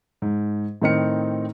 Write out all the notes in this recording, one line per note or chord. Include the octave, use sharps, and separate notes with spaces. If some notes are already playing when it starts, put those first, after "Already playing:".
G#2
A2 D#3 C4 D#4 F6 C#7